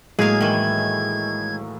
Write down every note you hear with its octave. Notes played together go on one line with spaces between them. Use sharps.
A2 F#3 G#3 A#3 G#4 F5 G#6
D#3 E3